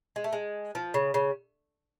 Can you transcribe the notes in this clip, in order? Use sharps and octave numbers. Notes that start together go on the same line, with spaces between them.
G#3
A3
G#3
F3
C#3
C#3